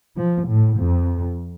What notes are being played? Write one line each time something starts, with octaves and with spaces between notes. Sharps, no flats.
F3
A2
F2